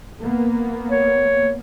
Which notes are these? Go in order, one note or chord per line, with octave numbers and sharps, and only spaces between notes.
A#3 B3
C#5